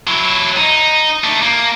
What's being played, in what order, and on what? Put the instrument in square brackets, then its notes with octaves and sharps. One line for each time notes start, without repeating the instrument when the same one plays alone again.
[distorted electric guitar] F#3 E4
D#4
A3 D4
A#3